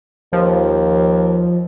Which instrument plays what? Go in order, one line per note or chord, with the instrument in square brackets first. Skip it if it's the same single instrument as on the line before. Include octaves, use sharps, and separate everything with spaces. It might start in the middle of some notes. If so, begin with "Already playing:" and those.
[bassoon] D#2 [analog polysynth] F3